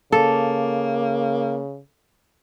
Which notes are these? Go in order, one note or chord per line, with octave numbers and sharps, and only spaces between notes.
C#3 A#3 A4